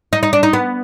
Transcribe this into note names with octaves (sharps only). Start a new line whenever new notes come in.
D#4
D#4
D4
D#4
B3